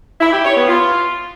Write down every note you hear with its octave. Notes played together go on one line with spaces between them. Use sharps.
E4
G4
C#5
B3
F4